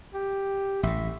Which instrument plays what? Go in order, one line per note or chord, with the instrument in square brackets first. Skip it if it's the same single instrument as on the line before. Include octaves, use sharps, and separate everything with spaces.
[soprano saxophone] G4
[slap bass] A1 A2 [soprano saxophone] E5